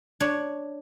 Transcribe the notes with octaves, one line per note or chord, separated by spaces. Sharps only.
D4 C#5